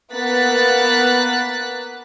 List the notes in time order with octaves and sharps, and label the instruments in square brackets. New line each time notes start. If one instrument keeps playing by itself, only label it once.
[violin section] A#3 B3 F#6 A6 B6